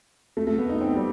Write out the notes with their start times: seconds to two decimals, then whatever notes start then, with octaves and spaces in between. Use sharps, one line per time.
0.37 A3
0.47 A3
0.58 B3
0.69 D#4
0.81 C4
0.96 G3